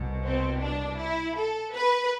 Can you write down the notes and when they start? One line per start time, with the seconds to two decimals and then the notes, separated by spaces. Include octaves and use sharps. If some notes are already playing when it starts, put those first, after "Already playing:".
Already playing: C2 B2
0.24 C4
0.62 D4
1.00 E4
1.37 A4
1.74 B4